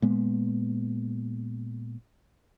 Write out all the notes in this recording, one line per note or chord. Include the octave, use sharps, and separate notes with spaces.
A#2 G#3 B3